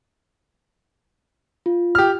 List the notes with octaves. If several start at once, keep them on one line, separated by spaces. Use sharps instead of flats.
F4
G4 F6